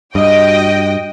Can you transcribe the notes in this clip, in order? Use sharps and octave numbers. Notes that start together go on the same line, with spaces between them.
G2 F#4 D#5 G5